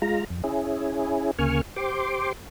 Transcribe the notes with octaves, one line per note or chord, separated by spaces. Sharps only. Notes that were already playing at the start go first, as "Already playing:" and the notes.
G#3 F4 A#5
F2
C#4 E4 G#4
D2 C#3 A#3 G#5 C#6 F6
G4 C5 C6 D6